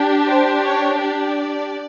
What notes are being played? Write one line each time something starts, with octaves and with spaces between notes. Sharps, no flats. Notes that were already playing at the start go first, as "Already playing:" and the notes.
Already playing: D4 G4
C5
C#5
D5